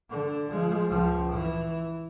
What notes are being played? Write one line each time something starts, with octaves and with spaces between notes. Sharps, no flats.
D3
F3 G#3
C#2 F3
E3